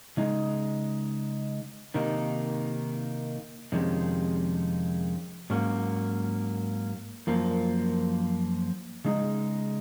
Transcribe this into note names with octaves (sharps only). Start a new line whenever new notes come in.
C#3 G#3 D#4
C3 D#3 A#3 D#4
F2 C3 D#3 G#3 C#4
G#2 F#3 A#3 C#4
F#2 F3 A#3
C#3 G#3 D#4